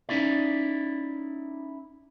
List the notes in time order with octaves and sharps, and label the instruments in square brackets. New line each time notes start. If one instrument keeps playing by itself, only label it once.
[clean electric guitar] C#4 D#4 E4 D5